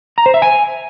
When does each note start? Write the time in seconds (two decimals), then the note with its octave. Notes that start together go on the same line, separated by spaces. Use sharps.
0.18 A#5
0.26 C5
0.34 E5
0.42 G#5